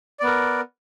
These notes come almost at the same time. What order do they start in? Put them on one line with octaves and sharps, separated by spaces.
D5 B3 A#4